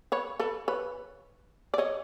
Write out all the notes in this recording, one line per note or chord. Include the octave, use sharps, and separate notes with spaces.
B4 C#5
A4 B4
B4 C#5
D5
C#5 D#5